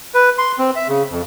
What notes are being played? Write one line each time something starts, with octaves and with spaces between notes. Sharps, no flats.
B4
C6
C4
E5
C#3
F2